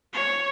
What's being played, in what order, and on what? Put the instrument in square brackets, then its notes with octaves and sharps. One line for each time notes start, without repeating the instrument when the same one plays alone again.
[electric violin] C#5